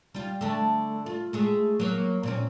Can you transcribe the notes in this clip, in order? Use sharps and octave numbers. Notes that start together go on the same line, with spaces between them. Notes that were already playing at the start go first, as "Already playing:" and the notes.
G3 F4
D3 A3
F4
G#3 A3 G#4
F#3 A#3
A#2 C4 C#4